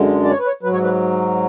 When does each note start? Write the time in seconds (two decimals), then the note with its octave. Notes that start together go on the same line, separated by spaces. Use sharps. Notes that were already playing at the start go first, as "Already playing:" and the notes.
Already playing: F#2 D3 G#3
0.24 D5
0.30 C#5
0.39 B4
0.46 C#5
0.63 F#3 B4
0.66 G#2
0.73 C#5
0.83 B4